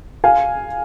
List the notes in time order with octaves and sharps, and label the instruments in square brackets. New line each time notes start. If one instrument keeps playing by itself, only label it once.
[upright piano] F5 G#5